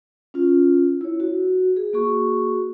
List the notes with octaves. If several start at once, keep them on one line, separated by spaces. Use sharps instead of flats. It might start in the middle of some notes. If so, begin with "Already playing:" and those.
C#4 F4
E4 C#5
F#4
G#4
A#3 F#4 G#4 C#6